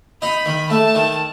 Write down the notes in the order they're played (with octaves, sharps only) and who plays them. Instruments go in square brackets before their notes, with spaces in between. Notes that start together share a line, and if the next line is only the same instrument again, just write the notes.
[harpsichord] D#4 [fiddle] B5
[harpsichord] D#3
[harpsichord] A3 [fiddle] A5
[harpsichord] D#3